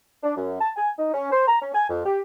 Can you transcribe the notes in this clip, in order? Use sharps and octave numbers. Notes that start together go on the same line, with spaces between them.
D4
F#2
A5
G#5
D#4
C#4
C5
A#5
C#4
G#5
F2
G4